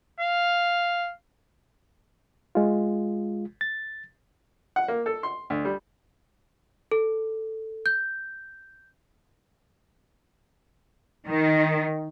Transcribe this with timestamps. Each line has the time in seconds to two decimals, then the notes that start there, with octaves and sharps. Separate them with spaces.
0.20 F5
2.55 G#3 F4
3.61 A6
4.76 F#5
4.88 A#3
5.06 A4
5.23 C6
5.50 D2
5.65 G3
6.91 A4
7.86 G6
11.28 D#3